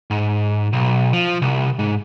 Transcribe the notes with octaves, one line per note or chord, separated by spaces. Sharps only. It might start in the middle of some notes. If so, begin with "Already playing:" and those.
G#2
B1
F3
C2
G#2